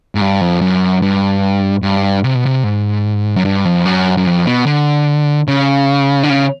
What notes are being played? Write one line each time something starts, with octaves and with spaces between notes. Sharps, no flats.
G#2
G2
F2
F#2
G2
G2
C3
B2
C3
G#2
F#2
G2
F2
F#2
F#2
F2
B2
D3
C#3
D3
C#3